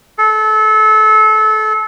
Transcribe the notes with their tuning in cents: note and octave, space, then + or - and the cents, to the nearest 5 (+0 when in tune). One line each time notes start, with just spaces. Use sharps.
A4 -25